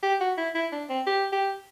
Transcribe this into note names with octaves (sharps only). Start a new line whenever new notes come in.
G4
F#4
E4
E4
D4
C4
G4
G4